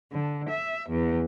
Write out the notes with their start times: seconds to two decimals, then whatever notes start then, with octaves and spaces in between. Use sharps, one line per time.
0.11 D3
0.49 E5
0.88 E2